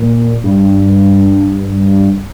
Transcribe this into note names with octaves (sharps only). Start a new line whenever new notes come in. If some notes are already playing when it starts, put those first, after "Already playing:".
Already playing: A#2
G2